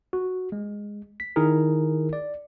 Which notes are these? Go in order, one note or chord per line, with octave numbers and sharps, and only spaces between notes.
F#4
G#3
B6
D#3 D#4 E4 G#4 A#4
D5